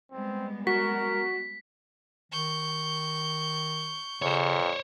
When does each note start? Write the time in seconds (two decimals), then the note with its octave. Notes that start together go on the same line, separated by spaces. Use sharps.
0.12 G3 G#3 B3 C4
0.67 F#4 A#4 B6
2.32 D#3 C#6 G6
4.22 F2 C#3 C5 C#5